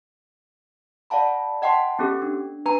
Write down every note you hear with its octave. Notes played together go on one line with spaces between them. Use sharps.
D5 F5 F#5 A5 B5
D#5 F#5 G5 A5 C6
B3 C#4 G4 A4
D4
D4 B4 G#5 A#5